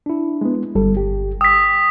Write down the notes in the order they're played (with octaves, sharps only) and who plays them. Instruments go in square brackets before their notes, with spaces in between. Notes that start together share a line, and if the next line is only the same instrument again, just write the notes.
[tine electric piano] D4 E4
[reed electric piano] G#3 B3
[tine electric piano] G1 [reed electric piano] G3 A4
[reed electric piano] G4
[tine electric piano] G5 [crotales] D#6 B6 [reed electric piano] E6